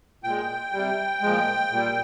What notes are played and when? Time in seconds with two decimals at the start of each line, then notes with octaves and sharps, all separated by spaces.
0.24 A#2 G#3 G5
0.72 C3 G3
1.22 A#2 F3 G#3
1.71 A#2 G3